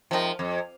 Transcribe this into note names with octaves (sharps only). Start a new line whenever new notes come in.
C3 D#3 F3 G#3
F2